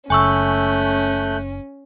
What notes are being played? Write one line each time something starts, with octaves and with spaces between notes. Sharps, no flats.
F#1 A3 C#4 G#5 C#6 E6 F#6 G6